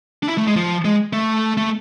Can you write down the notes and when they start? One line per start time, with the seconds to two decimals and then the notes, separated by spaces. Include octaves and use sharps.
0.23 D4
0.28 E4
0.38 A3
0.47 G#3
0.56 F3
0.85 G#3
1.13 A3
1.58 A3